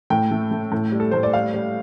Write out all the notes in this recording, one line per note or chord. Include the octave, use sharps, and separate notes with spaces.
A2 G5
A3
A3
A2
G3
A4
A2 C5
D5
G3 F5
G3